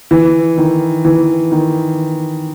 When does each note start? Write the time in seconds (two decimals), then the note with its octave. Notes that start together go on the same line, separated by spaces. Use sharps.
0.11 E3
0.58 D#3
1.05 E3
1.52 D#3